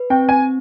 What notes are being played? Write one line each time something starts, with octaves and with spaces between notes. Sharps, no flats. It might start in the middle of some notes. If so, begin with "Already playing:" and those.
Already playing: B4
C4 G5
G#5